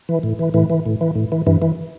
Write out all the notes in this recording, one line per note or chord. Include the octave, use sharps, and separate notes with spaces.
E3
A2
E3
A2 E3
E3
A2
E3
A2
E3
G2 E3
E3